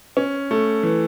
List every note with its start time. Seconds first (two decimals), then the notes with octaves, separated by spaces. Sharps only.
0.17 C#4
0.51 A3
0.83 E3